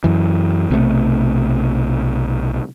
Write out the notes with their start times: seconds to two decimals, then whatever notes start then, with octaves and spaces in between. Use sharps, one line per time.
0.04 F#2 E3
0.70 B1 C3 F#3 A3